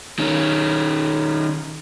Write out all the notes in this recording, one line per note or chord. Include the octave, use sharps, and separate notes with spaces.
D#3 C#4